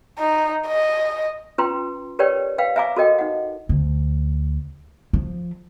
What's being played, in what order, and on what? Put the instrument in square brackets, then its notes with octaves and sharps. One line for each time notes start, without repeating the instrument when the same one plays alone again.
[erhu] D#4
D#5
[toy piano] C#4 F4 B4 G5 A#5 C6
G4 A#4 B4 C#5 D5 G5
B4 F5 G5
E5 F5 G#5 A#5 D6
F#4 A4 A#4 D#5 G5
D#4 F#5
[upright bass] D2
F3